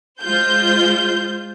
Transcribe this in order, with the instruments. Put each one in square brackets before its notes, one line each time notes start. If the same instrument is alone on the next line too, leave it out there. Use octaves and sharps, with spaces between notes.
[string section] G#3 F4 C5 G6